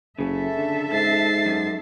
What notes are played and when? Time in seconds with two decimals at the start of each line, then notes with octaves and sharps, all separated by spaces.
0.19 F#1 C#3 A4 E5
0.58 D3
0.92 G#2 A6 C7
1.46 F#2